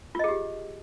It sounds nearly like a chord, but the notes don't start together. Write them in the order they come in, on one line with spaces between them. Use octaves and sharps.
F4 D#5 G#4 G4